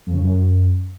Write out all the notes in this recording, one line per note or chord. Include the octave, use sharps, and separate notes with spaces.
F2
C#3
F#2